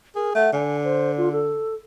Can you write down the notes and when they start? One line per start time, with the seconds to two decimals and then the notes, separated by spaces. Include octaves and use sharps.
0.16 G#4 A#4
0.35 A3 F#5
0.53 D3 G#5
0.84 C5
1.18 F4
1.32 A4